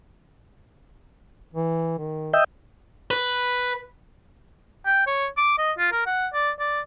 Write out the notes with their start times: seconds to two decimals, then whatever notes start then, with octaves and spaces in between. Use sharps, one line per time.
1.54 E3
1.98 D#3
2.34 D#5 E5 G5
3.11 B4
4.86 G5
5.07 C#5
5.38 D6
5.58 D#5
5.78 F4
5.92 A#4
6.06 F#5
6.33 D5
6.59 D5